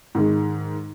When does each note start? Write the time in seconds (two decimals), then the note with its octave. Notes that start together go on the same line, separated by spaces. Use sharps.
0.15 G#2 D#3 G#3